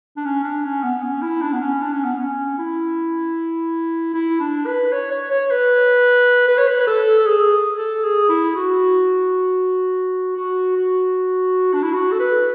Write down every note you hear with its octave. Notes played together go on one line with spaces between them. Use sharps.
D4
C#4
D4
C#4
B3
C#4
E4
D4
B3
C#4
D4
C#4
B3
C#4
E4
E4
D4
B4
C#5
C#5
C#5
B4
B4
C#5
B4
B4
A4
A4
G#4
A4
G#4
E4
F#4
F#4
F#4
D4
E4
F#4
A4
B4